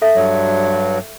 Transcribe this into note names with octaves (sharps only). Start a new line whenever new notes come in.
A4 E5
G2 F#3